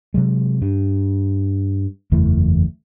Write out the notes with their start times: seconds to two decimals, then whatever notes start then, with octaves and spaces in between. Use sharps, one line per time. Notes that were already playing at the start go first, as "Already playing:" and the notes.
0.14 C3 F#3 G#3
0.62 G2
2.12 F#1 E2 E3 A3